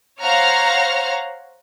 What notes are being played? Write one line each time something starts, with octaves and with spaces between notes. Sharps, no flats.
C5 C#5 F5 F#5 A#5 F6